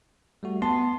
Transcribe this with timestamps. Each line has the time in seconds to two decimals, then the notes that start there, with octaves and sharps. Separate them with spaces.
0.43 G3 A3 F#4
0.62 B3 A5 C6